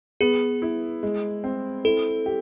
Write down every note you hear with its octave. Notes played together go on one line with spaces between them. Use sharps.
B3 G#4
E4
G#3
C4
E4 A4
G4